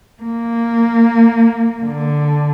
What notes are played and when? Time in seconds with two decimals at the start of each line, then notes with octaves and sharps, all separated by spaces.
0.23 A#3
1.83 D3